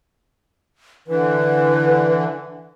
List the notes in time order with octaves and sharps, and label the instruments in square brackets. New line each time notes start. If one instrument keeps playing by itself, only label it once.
[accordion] D3 E3 [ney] B4